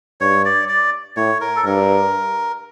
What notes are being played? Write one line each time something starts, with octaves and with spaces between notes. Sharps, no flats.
G2 C#5
D5
D5
A2 C#5
A#4
A4
G2 A#4